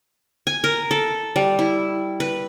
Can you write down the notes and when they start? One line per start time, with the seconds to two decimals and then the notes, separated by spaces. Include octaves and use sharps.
0.47 G#5
0.64 A#4
0.91 A4
1.36 G3
1.59 E4
2.20 B4